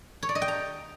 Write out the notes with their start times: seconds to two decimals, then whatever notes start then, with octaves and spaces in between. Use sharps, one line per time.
0.23 C#5
0.29 D5
0.35 D#5
0.42 G5
0.48 A#5